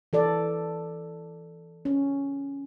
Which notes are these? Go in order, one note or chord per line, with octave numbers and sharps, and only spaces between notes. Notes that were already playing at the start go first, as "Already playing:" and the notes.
E3 A4 D5
C#4